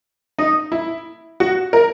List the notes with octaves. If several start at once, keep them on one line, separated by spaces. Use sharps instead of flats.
D#4
E4
F#4
A#4